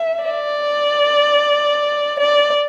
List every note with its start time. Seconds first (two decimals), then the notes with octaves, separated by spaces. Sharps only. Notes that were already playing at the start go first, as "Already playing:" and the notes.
Already playing: E5
0.25 D5
2.20 D5